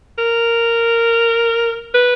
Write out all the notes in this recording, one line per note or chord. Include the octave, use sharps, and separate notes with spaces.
A#4
B4